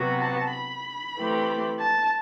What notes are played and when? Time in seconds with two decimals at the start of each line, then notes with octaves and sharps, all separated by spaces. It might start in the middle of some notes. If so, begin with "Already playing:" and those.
Already playing: C3 F#3 B3 F#4
0.21 A5
0.52 B5
1.16 E3 A3 C4 G4
1.80 A5